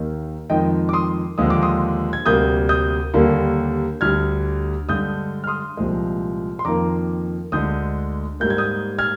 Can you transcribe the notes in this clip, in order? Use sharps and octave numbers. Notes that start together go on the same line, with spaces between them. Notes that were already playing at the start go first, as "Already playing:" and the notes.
Already playing: D#2 D#3 A#3
F2 D#3 G#3 D#5 G5
D6
C6 D#6
D#2 D3 F3 G#3 D#6
D6
C6 D#6
G#6
D2 C3 G3 A#3 D#6 G6
D#6 G6
D#2 D3 G3 A#3
D2 D3 G3 F6 G#6
G2 D3 G#3 D#6 G6
F6
C6 D#6
C2 A#2 F3 G#3
C6
F2 D#3 A#3 A#5 D6
D2 D3 G#3 D#6 G6
G#2 G3 A#3 G6
G#6
D#6 G6
F6 G#6